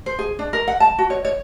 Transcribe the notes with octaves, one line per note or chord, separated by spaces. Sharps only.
C5
G#4
D4
A#4
F#5
A5
F#4
C#5
C#5